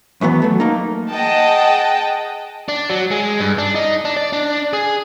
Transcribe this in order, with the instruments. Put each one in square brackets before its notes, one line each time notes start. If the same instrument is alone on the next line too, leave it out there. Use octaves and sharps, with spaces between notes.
[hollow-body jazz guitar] D#2 E3 F#3 B3
F#3 A3
A#3 D#4
[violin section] G#4 D#5 F#5 G5 A5
[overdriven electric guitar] D4
F#3
G#3
G2
D4
D#4
D4
D5
D4
G#4